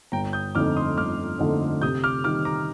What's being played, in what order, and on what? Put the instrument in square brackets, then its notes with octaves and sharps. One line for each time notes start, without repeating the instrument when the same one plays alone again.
[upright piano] G1 [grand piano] G5 A#5
[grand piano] D#6 G6
[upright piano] F2 D3 A3 D#4 [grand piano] D6 F6
[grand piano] C6 D#6
[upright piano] G1 [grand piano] D6 F6
[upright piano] F2 D3 A3 D#4
[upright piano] C3 [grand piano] D#6 G6
[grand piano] D6 F6
[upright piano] D#3 G3 [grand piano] D6 F6
[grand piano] A#5 D6